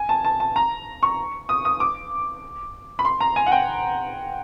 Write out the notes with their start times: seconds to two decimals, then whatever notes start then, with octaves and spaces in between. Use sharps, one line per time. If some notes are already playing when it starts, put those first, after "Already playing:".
Already playing: G#5
0.09 A5
0.25 A5
0.40 A5
0.56 A#5
1.03 C#6
1.49 D#6
1.65 D#6
1.80 D6
2.99 B5
3.05 C6
3.21 A#5
3.36 G#5
3.46 F#5
3.52 G5